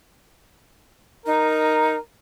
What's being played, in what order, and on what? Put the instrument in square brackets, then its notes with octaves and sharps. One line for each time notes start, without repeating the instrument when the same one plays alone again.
[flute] D#4 [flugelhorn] A#4